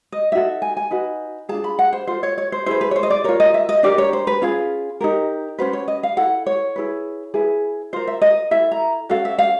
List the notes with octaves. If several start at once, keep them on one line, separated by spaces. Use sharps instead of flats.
D#5
D#4 F#4 A4 E5
G#5
G#5
D#4 F#4 B4
D4 F4 G#4 A5
B5
F#5
C5
F4 A4 C5
C#5
C#5
C5
E4 G#4 B4 C5
B4
C#5
C5
D#5
D5
F4 A#4 C#5
D#5
E5
D#5
D4 G4 A#4 D5
C#5
C5
B4
C#4 F4 G#4 B4
D#4 G4 A#4
C#4 F#4 B4 C5
C#5
D#5
F5
E4 A4 F#5
C#5
E4 G#4 B4
E4 G#4 B4
F4 A#4 C5
E5
D#5
E4 A4 E5
A#5
C#4 F#4 A4 F5
E5
F5